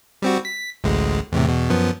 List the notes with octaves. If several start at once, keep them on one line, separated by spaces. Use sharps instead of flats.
G3 C4 F#4
B6
A1 D2 G#3
E2 A2 C3
E2 B2
F#2 F3 B3